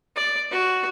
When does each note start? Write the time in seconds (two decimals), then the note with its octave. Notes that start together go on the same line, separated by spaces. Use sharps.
0.16 D5
0.51 F#4